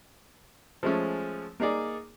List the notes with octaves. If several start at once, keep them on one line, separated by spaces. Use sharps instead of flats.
F3 G#3 A3 C#4
A#3 D#4 G#4 D5